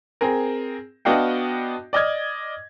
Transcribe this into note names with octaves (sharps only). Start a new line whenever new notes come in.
C4 G#4 A#4
B3 D4 F#4 D#5 F5 G5
D5 D#5 F6 G#6